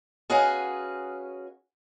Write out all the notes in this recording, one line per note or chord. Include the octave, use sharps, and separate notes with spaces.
C#4 F#4 G#4 B4 D#5 F5